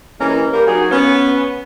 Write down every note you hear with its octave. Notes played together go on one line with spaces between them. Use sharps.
E3 G3 G#3 A#3 C#4 A#4
G3 A#3 G4 A#4
F#3 D#4 F#4 G#4
B3 C#4